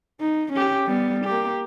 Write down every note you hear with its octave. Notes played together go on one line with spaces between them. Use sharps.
D#4
C#4 G4
G3 B3
A#3 G4